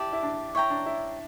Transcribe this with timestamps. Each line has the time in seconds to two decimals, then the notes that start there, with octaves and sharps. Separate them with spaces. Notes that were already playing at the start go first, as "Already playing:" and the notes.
Already playing: E4 G4 D5 A5
0.13 E4
0.23 D4
0.55 E4 C#5 G5 A#5
0.70 D4
0.86 E4